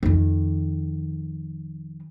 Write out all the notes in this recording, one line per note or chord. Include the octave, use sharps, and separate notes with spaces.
F2 D#3